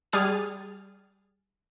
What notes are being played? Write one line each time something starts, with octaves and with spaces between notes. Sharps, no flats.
G3 G#4 F6 A6 D#7